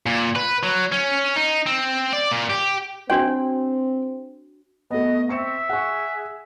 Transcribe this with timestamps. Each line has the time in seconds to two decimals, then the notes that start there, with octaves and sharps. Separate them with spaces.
0.06 A#2
0.36 B4
0.63 F#3
0.92 C#4
1.36 D#4
1.66 C4
2.13 D5
2.32 A#2
2.50 G4
3.10 C4 D4 F#4 C#5 G5
4.91 A3 B3 D#5
5.29 C4 E5 C#6 C#7 E7
5.69 G#4 F#5 C#6